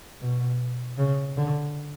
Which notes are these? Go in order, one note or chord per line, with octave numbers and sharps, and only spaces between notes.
B2
C#3
D3